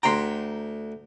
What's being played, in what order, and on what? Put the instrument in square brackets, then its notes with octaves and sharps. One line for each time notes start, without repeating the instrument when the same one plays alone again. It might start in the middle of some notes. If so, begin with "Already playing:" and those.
[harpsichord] D2 G5 [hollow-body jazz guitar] A#5 C6